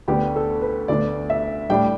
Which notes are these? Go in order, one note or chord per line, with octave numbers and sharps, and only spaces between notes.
D2 D3 B3 D4 G4
A4
B4
D2 D3 B3 D4 D5
E5
A2 G3 D4 G5